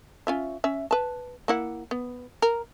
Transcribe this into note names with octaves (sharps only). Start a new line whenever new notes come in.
C#4 F4 E5
C#4 E5
B4 A5
A#3 E4 F#5
B3
A#4